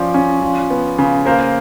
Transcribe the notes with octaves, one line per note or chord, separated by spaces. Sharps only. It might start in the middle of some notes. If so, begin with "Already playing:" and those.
Already playing: F3 C#4 C5 D5
C#4
F3
B3
C#3
A#3 A#4 C5